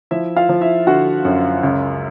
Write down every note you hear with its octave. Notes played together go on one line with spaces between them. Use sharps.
F3 E4 E5
F4 F5
F3
E4 E5
D3 F#4 F#5
F#2
C#2